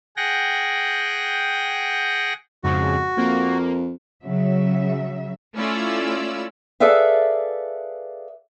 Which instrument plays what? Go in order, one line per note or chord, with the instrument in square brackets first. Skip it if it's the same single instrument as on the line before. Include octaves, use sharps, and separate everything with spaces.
[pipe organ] G#4 F#5 G5 A#6
[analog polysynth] F2 G#2 C#3 [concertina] F#4
[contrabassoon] F2 [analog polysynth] A#3
[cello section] C#3 F#3 E5
[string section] A3 C#4 E4 F4 D5 E6
[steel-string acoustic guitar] G#4 A4 B4 D5 E5 F5